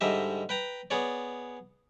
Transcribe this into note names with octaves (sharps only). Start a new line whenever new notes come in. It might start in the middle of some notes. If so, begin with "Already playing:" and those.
G#2 D3 G3 D#5 E5
B4 G5 A#5
B3 G#4 C#5 D5